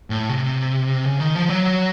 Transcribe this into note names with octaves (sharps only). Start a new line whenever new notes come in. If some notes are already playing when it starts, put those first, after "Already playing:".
A2
C3
C#3
D#3
F3
F#3